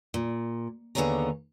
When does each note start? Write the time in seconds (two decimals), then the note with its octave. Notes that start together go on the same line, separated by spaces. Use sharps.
0.14 A#2
0.95 D#2 D3 B3 G#4 C#5 A#5